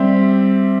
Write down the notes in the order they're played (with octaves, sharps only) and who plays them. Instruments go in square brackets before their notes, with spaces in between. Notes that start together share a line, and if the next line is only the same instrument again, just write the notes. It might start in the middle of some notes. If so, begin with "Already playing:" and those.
Already playing: [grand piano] G3 C4 G4 E5